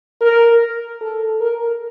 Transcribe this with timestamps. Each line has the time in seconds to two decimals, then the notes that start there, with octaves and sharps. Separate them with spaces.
0.21 A#4
1.01 A4
1.41 A#4